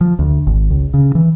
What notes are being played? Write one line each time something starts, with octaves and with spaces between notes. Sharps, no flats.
F3
D2
G#1
C#2
C#3
E3